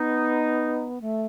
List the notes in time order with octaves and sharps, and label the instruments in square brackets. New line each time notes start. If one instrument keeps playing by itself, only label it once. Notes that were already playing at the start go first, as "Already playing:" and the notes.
Already playing: [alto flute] B3 [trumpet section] D#4
[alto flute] A3